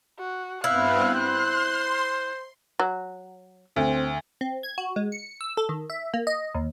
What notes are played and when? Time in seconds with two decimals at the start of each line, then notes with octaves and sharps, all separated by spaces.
0.19 F#4
0.64 G2 B3 C4 E4 F5 F#6
1.15 C5 C6
2.79 F#3
3.76 D2 C4
4.41 C4
4.63 G#6
4.78 F#4
4.96 G#3
5.12 C#7
5.41 E6
5.57 A4
5.69 D#3
5.90 E5
6.14 A#3
6.27 D#5
6.55 D#2